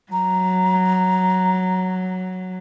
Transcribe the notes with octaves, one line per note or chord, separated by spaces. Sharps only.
F#3 A#5